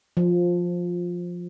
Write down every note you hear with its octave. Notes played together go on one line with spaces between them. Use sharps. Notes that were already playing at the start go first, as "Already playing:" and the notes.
F3